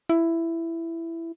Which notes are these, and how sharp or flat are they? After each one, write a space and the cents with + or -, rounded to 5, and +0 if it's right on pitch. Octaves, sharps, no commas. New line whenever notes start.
E4 +10